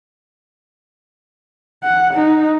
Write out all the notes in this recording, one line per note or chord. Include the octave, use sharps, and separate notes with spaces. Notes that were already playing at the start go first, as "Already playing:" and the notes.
F#5
D#4